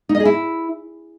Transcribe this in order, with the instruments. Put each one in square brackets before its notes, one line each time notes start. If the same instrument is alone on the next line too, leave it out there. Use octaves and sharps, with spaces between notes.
[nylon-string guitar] D#4
D#5
G#4
E4